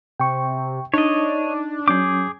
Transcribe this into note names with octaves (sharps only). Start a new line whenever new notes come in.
C3 G5 C#6
D4 D#4 C#5 D#5
F#3 C#4 G#4 D6 G6